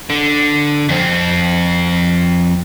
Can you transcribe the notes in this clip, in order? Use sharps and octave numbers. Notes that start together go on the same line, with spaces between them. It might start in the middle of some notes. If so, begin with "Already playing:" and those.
D3
F2 C4